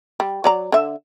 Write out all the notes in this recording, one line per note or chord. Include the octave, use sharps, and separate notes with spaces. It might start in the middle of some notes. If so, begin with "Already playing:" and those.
G3
F#3 D5 A#5
D3 E5